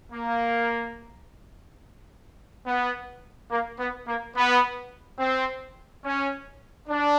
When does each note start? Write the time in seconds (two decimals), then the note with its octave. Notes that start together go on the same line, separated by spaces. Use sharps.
0.12 A#3
2.65 B3
3.50 A#3
3.78 B3
4.07 A#3
4.35 B3
5.19 C4
6.04 C#4
6.88 D4